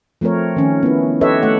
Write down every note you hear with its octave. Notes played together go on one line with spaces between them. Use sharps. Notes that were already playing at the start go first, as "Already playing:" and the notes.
F3 A3 C4 A#4 C#5
D#3 C#4
B3 E4
G4 A4 B4 C#5 D#5 E5
A3 F#5